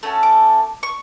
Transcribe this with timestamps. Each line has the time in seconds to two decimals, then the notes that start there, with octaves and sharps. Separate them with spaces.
0.03 A3 C#4 F#4 A4
0.23 D6
0.83 C#6